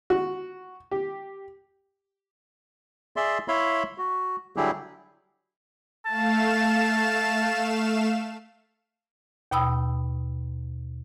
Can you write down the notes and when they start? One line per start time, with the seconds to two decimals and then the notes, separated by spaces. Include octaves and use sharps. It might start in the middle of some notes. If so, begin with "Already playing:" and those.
0.10 F#4
0.91 G4
3.16 G#4 D5 E5 C6
3.48 E4 C#5 E5 F5 B5 C6
3.98 F#4
4.56 D3 F#3 G3 E4 G4 G#4
6.06 A3 F5 A5 E7
9.51 D#2 B2 G5 B5 D#6 E6